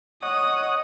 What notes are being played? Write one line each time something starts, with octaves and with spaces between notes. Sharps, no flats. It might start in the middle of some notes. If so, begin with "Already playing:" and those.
C#5 D#5 F#5 D#6